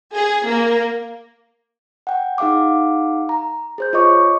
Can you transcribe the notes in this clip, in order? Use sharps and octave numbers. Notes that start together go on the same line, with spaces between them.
G#4
A#3
F#5 G5
D#4 G#4 F5 F#5 D6
A#5
G#4 C5 G6
F4 C#5 D#5 C#6 D6